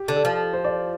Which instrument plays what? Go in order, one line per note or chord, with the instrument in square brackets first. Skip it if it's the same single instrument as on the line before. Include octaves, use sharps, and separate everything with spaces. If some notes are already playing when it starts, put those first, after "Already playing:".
Already playing: [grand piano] G4
[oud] D3
[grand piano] A4
[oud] F3
[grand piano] C5
D5